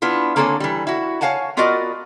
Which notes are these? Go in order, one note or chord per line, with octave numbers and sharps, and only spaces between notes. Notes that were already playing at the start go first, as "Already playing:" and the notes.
B3 D4 E4 F4
D3 A#3 C4 A4 C#5 G#5
E3 G3
E4 F#4
C#5 D#5 F5 F#5 G#5 A5
B3 F4 F#4 A#4 D5 D#5